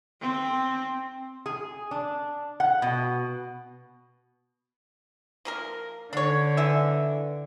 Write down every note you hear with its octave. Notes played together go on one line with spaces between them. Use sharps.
C4
G#4
D4
F#5
B2
F3 A#3 A#4
D3 D4 C#5
E3 E5